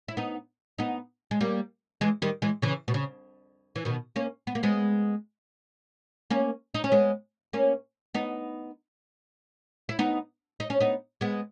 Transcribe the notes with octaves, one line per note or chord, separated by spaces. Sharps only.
E4
B3 D#4
B3 D#4
G#3
G3 A#3
E3 G#3
D#3 G3
E3 G#3
C#3 E3
B2
C#3
E3
B2 D#3
A#3 C#4
B3
A#3
G#3 B3
A#3 C#4
D#4
C#4
G#3 B3
A#3 C#4
B3 D#4
E4
B3 D#4
D#4
C#4
B3 D#4
G#3 B3